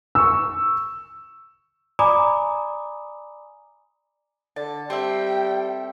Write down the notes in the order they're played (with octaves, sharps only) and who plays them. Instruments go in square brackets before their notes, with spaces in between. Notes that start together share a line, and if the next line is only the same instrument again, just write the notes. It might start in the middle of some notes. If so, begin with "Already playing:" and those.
[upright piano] C#6 E6
[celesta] D5 G#5 A#5 B5 D6 D#6
[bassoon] D3 [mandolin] A5
[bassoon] G3 [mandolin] C4 A4 E5 [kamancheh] G5